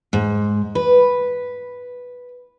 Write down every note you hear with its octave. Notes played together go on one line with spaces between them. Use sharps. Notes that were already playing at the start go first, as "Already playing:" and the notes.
G#2
B4